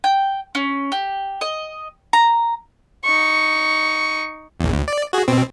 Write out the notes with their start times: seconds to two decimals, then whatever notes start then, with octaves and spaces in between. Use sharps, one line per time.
0.04 G5
0.55 C#4
0.92 G4
1.41 D#5
2.13 A#5
3.04 D#4 C#6
4.60 A#1 E2
4.73 D2
4.88 D5
5.13 F#4 G#4
5.28 B2 C4